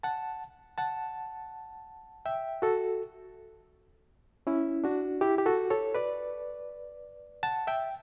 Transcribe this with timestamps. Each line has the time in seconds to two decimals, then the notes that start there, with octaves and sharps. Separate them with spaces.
0.03 F#5 A5
0.78 F#5 A5
2.26 E5 G5
2.62 F#4 A4
4.47 C#4 E4
4.84 D4 F#4
5.21 E4 G4
5.38 G4
5.46 F#4 A4
5.70 A4 C#5
5.95 B4 D5
7.43 F#5 A5
7.67 E5 G5